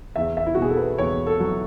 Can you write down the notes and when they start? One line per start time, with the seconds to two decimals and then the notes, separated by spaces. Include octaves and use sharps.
0.16 E2 E5
0.37 E5
0.46 E4
0.55 B2 F#4
0.62 G#4
0.70 A4
0.77 B4
0.98 E2 C#5
1.26 A4
1.40 F#3